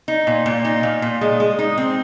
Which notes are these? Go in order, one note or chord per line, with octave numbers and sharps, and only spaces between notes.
D#4
A#2
A#2
D#4
A#2
A#2
G#3
G#3
D#4
C4